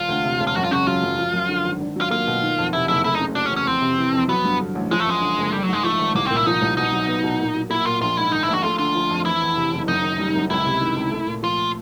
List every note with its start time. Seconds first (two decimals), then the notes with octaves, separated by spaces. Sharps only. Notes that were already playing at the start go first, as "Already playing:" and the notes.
Already playing: E1 F4
0.09 D2
0.24 C3
0.40 E1
0.47 F4
0.56 F#2 F#4
0.64 F4
0.71 C#3 F#4
0.87 F#3 F4
1.02 F#2
1.17 F3
1.33 F#2
1.49 D3
1.65 G#1
1.81 D4
1.96 F#3 F4
2.11 A#3 F4
2.27 B2
2.43 D#3
2.58 F2
2.73 C3 E4
2.88 F#1 E4
3.04 A3 E4
3.15 D#4
3.20 C#3
3.35 F#3 D4
3.46 C#4
3.51 E2
3.57 C#4
3.66 F2 C4
3.81 C3
3.98 E3
4.12 F2
4.28 F#3 B3
4.44 G2
4.59 D3
4.75 A1
4.91 F3 G#3
5.00 A3
5.06 F#2 G#3
5.22 D3
5.38 F#1
5.52 G3 A3
5.63 F#3
5.69 G#2 G#3
5.83 F3 A3
5.99 G#1
6.15 C2 A#3
6.26 A#2 C4
6.36 E4
6.46 F3 D#4
6.62 C2
6.77 B2 D#4
6.93 F#3
7.08 B3
7.24 B2
7.40 A#2
7.55 F#3
7.70 A#3 E4
7.85 A#2 F4
8.01 A#1 F4
8.17 G#2 E4
8.32 D#3 D#4
8.43 E4
8.49 A#1 F#4
8.63 A3 F4
8.78 D3 F4
8.95 F3
9.11 F2
9.25 E3 E4
9.42 E2
9.56 C3
9.72 F#1
9.87 F#2 D#4
10.03 D#3
10.19 G3
10.35 F#2
10.50 C#2 E4
10.66 C3
10.81 D#3
10.96 C#2
11.12 A3
11.27 A#2
11.43 F3 F4